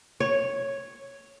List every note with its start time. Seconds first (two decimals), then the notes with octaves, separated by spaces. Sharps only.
0.20 C#5